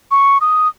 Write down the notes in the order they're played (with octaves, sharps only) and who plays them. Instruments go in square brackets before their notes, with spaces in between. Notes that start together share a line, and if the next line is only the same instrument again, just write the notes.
[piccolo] C#6
D#6